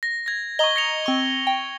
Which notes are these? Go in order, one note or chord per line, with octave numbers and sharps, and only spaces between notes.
A#6
G#6 A#6
D#5 A#5 C#6 D#6 G7
A#6 C#7 F7
C4 C#6
G5